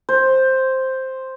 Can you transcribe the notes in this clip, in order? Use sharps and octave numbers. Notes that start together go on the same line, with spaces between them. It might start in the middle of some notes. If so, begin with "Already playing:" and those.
C5